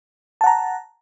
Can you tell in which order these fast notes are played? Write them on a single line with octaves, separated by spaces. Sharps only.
A5 F#5 A#5